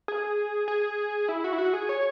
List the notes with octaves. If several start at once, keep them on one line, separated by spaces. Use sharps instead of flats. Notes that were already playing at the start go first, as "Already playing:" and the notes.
G#4
G#4
E4
F#4
E4
F#4
G#4
C#5